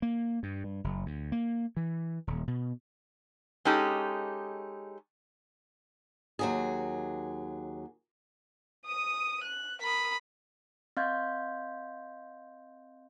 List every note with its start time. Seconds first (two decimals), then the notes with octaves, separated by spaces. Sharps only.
0.02 A#3
0.43 G2
0.64 G2
0.84 F#1
1.06 D2
1.32 A#3
1.77 E3
2.27 D#1
2.47 B2
3.65 G#3 C#4 D#4 G4 A4
6.39 D#2 F#3 G#4
8.87 D#6 D#7
9.44 F#6
9.82 A#4 B5 D#6
10.97 C4 D#5 F5 C6 G6 G#6